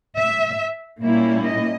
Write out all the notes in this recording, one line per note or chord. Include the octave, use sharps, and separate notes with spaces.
E5
A#2 G3 A#3 C#4 E4
D#5